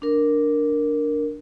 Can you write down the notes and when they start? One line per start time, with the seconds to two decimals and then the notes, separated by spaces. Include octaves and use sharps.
0.02 D4 A#4